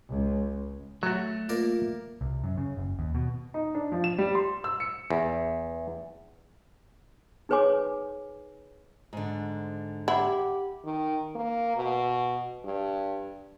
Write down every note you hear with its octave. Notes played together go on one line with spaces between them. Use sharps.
C#2
F#3 A3 F#4
A#3 F4 A#4 D5
C2
F#2
C#3
F#1
D#2
B2
D#4
D4
F3
E7
G3
C6
E6
C#7
E2
D#4 G#4 B4 C#5 G#5 D6
G#2 D3
E4 G4 F#5 B5
D#3
A#3
B2
G2